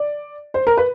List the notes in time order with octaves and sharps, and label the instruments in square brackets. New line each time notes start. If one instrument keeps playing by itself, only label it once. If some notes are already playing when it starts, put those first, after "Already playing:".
Already playing: [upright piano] D5
C5
A#4
B4